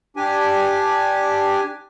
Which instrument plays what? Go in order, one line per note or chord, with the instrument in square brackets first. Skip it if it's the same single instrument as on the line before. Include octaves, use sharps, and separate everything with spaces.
[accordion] D4 G4 G#5